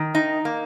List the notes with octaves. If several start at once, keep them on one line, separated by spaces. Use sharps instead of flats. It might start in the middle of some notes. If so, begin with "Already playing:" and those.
Already playing: D#3
D#4
A#3